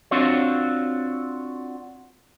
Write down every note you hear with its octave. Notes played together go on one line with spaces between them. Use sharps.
C4 D4 F4 F#4 C#5